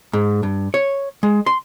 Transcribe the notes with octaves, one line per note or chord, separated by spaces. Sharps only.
G#2
G2
C#5
G#3
C6